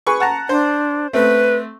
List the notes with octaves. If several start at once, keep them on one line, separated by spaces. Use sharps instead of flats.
G#4 B4 C#6
F#5 A5 A#5
D4 C5
A3 C4 B4